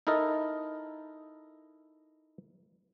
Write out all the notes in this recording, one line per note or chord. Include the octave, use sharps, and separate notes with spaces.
D#4 E4 A4 A#4 D#5